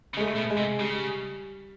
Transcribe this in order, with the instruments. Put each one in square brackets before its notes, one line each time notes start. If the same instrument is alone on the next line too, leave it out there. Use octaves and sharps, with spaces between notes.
[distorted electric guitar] C#3
[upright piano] G#3
A3
[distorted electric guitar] B2
[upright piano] G#3
[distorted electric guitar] C3
[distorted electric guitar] C#3 [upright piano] G3